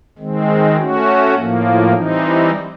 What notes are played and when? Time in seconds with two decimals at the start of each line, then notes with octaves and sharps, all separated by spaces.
0.19 D#3 G#3 C4
0.77 A3 C#4 F#4
1.34 A2 F3 A#3
1.92 E3 G3 C4 D#4